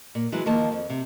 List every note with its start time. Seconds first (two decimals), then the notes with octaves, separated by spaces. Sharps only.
0.15 A#2
0.32 E3 F#3 G#3
0.46 D#3 F3 A#3 A5
0.72 F2
0.90 C3